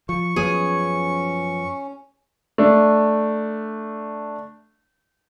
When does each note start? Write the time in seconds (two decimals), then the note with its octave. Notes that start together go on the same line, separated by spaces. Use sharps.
0.09 F3 C#6
0.36 F#2 F3 B3 C#4 G#4
2.58 A3 D4